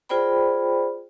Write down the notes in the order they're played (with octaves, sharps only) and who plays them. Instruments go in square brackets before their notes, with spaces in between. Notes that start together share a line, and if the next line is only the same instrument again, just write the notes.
[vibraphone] F4 G#4 C5 D5 G5 B5